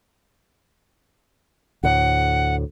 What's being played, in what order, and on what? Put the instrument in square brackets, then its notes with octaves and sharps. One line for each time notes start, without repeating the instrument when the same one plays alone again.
[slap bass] D2 A2 [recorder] F#5